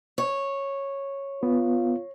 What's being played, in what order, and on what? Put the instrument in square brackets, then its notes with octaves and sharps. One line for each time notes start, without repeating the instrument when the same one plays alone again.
[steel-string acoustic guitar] C#5
[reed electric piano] B3 [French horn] F4